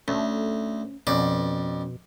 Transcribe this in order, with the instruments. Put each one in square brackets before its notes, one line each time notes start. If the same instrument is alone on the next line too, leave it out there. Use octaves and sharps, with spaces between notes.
[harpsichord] D2 [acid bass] A3 [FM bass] C#4
[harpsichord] F2 D5 [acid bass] B2 [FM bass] C#4